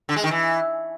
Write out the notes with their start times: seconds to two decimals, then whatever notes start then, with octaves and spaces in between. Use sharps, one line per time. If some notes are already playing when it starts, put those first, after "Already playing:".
0.09 D3
0.16 G#3
0.24 D#3
0.31 E3